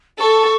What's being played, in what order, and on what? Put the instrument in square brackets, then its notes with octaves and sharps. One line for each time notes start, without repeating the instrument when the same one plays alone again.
[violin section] A4 [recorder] C#6